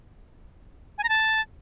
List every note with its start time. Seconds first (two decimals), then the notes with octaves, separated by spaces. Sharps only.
0.98 G#5
1.04 A#5
1.09 A5